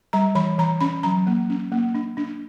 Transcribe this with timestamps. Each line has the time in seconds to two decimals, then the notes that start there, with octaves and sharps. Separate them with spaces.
0.13 G3 A#5
0.35 E3 B5
0.58 E3 A#5
0.81 C#4 B5
1.03 F#3 A#5
1.27 A#3
1.50 C#4
1.72 A#3
1.95 D4
2.17 D4